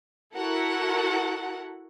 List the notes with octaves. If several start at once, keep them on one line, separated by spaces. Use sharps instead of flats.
E4 F#4 A4 A#4 F#5